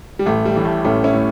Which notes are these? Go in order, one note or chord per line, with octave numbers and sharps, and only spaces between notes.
G3
A1 A3
G3
A2 E3
A3
A1 A3 C#4
C#4 E4
A2